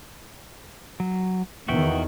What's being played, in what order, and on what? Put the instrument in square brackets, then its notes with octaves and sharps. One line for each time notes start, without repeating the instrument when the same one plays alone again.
[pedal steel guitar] F#3
[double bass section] E2 D#3 [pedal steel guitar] F#4 E5 G5